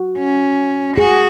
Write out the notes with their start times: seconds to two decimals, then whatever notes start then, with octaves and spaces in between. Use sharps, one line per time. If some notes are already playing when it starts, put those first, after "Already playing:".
Already playing: F#4
0.18 C#4
0.97 F#4 G#4